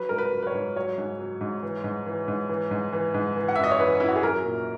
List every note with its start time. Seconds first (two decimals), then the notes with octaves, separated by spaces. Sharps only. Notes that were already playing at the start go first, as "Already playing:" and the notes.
Already playing: F#3 B4
0.09 G#2 A#4
0.18 B4
0.33 F#3
0.43 B4
0.47 C#5
0.54 G#2
0.76 F#3 C#5
0.98 G#2
1.19 F#3
1.41 G#2
1.63 E3
1.84 G#2
2.06 E3
2.28 G#2
2.49 E3
2.71 G#2
2.93 E3
3.14 G#2
3.36 E3
3.48 F#5
3.56 F#2 E5
3.64 D#5
3.71 C#5
3.80 E3 B4
4.00 F#2 E4
4.08 F#4
4.16 G#4
4.23 F#3 A#4
4.45 A#2